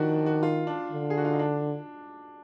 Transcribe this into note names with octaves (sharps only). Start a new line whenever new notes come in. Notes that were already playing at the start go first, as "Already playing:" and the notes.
Already playing: D#3 F3 D4 F#4
F#4
F4
D4
D3
G#4
F#4
F4
D#4
D4